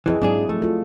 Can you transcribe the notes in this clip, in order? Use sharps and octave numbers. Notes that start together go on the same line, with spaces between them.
F2 E3 E4 G#4 D#5
G#2 F#3 C4 D4 E4 G#4
F3 A3
F4 A4